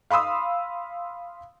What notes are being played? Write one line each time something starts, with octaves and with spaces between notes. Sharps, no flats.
F5 B5 C6 D#6 E6